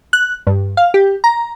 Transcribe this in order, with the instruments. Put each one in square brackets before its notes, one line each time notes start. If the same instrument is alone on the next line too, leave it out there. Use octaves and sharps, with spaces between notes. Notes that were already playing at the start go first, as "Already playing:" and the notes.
[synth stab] F#6
G2
F5
G4
A#5